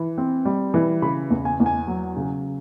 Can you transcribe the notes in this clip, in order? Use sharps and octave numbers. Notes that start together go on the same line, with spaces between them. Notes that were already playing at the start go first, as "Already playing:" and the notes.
Already playing: E3
C4
G3
E3
C#3 B5
E2
G#5
E2
G#5
F#3
C#3